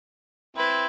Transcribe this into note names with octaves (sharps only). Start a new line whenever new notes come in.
C4 E4 B4